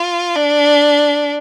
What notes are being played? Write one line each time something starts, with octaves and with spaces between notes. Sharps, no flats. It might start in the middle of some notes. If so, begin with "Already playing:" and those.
Already playing: F4
D4